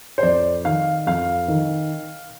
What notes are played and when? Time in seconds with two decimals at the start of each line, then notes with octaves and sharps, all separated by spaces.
0.18 C5
0.23 F2 D5
0.65 D#3 F5
1.06 F2 F5
1.48 D#3